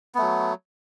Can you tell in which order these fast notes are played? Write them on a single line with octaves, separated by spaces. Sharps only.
B3 A3 F#3